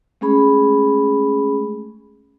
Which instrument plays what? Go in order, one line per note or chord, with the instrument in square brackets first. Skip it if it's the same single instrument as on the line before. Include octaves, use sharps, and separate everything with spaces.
[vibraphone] G#3 A3 C#4 G#4 B5